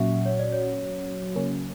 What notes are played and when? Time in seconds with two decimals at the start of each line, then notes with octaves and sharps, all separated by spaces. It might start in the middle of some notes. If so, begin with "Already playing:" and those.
Already playing: A#2 F#3 C#4 F#4 E5
0.26 C#5
0.39 D5
0.52 C#5
1.35 C#3 F#3 A#3 C#4